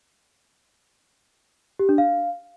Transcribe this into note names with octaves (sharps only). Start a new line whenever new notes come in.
G4
D4
F5